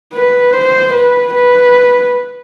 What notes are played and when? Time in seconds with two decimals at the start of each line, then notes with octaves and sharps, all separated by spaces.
0.14 B4
0.53 C5
0.94 B4
1.34 B4